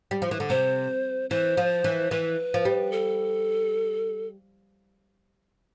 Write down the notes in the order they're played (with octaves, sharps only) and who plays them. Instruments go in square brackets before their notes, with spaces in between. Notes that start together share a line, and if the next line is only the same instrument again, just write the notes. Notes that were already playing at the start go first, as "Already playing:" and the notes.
[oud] G3
F3
E3
D3
[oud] C3 [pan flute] C5
[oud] E3 [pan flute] C5
[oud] F3
E3
[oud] E3 [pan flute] B4
[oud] F3
G3
[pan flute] A4